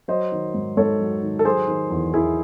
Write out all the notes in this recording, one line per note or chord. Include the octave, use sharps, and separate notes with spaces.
F#3 C5 D#5
D#3
G#2
G#2 A4 C#5
F#3
D#3
A4
F#3 G#4 C5
D#3
E2
E2 E4 G#4